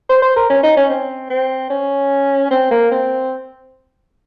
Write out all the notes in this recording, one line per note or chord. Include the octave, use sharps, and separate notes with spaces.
C5
C5
A#4
C#4
D#4
C#4
C4
C4
C#4
C4
A#3
C4